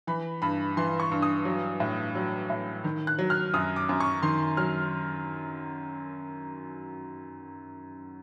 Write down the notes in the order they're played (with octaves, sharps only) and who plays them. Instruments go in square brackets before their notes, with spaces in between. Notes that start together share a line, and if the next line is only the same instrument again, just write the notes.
[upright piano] E3 B5
G2 B5
E3 C6
C#6
G2
D#6
F#3
A2
F#3
A2
D#3
F#6
F#3
F6
F#2 D#6
D6
F#2
C#6
D#3 C6
F#3 F6